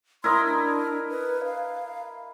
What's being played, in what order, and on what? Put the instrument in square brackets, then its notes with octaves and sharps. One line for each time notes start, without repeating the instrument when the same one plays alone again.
[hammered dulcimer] E4 A#4 D#5 [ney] C6
[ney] D4
B4
F5